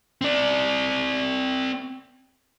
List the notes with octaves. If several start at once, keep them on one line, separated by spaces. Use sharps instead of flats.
C4 D5